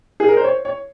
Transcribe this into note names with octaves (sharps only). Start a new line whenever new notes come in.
G#4
A#4
C5
C#5
C#5